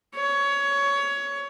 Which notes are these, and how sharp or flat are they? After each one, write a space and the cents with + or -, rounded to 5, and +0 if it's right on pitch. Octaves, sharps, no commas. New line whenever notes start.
C#5 +20